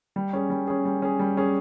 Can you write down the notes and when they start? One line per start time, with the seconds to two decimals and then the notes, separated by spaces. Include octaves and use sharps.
0.16 G3
0.33 C#4 G#4
0.50 G3
0.67 C#4 G#4
0.85 G3
1.02 C#4 G#4
1.19 G3
1.37 C#4 G#4